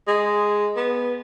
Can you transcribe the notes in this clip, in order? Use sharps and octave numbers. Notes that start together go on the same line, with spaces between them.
G#3
B3